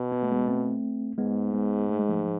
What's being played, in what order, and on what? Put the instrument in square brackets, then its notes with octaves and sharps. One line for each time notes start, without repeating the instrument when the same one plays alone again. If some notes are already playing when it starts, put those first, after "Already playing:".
Already playing: [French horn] B2
[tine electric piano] B3
A3
G#3 B3
A3 C4
[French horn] G#2 [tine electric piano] G#3 B3
[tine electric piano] G#3 B3
A3
G#3
F3 A3
F3